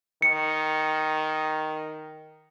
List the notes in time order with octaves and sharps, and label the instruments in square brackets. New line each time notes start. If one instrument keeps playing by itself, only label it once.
[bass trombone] D#3 [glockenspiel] C#7